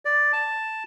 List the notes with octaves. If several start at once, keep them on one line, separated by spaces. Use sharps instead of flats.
D5
A5